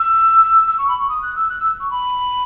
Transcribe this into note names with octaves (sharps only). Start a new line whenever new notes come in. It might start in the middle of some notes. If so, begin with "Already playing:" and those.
Already playing: E6
E6
C#6
B5
C#6
D#6
F#6
E6
F#6
E6
C#6
B5